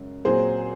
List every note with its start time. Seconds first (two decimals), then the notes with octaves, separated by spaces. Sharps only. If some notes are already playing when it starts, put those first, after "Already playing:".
Already playing: F#2 C#3 G#3
0.25 A#2 F#3 C4 G#4 C5